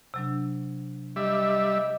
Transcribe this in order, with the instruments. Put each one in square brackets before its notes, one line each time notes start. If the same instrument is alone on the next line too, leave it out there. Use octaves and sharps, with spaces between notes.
[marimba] C3 F#3 D4
[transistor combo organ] G3 E5 [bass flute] D#5